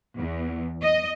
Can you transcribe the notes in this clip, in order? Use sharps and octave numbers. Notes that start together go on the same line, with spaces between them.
E2
D#5